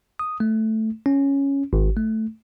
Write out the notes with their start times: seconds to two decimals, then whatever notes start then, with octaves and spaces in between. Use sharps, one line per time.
0.19 D#6
0.40 A3
1.06 C#4
1.73 G#1
1.97 A3